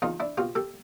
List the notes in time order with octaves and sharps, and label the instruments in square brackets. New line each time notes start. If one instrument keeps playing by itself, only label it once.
[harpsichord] E2 D#4 F4
D4 E4
B2 F4 G4
G4 A4